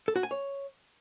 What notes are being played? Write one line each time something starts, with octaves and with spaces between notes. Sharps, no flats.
A4
F#4
G#5
C#5